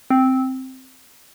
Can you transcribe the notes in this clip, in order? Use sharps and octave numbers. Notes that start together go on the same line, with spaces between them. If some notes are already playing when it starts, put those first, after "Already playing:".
C4